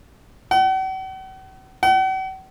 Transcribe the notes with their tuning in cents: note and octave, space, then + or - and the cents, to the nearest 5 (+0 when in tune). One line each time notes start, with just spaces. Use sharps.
F#5 +45
F#5 +45